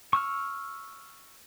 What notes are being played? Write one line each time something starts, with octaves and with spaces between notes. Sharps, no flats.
C#6 E6 F6